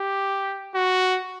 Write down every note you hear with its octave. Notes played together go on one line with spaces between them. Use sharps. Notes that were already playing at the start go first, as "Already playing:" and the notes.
Already playing: G4
F#4